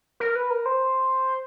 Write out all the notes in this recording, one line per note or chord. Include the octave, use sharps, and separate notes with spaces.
A#4
B4
A#4
C5